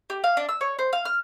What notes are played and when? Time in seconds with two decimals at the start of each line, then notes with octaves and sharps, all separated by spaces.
0.10 G4
0.24 F5
0.37 D4
0.49 E6
0.61 C#5
0.79 C5
0.93 F5
1.05 F6